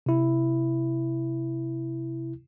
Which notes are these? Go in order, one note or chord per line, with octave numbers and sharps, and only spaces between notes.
C3 E4